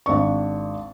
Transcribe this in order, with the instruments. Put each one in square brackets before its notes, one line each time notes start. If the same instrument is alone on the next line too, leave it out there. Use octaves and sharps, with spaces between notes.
[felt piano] G#1 D4 C#6